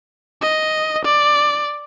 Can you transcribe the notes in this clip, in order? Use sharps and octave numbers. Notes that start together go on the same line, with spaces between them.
D#5
D5